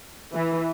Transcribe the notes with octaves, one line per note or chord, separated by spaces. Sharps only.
E3